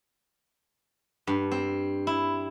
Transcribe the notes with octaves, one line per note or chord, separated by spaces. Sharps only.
G2
C4
E4